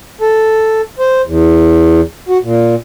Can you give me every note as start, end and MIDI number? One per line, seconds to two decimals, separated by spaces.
0.21 0.81 69
0.99 1.22 72
1.26 2.01 40
2.28 2.38 66
2.43 2.75 46